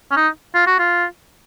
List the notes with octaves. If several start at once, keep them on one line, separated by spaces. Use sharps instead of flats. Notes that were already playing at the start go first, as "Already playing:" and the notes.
C#4
D#4
F4
F#4
F4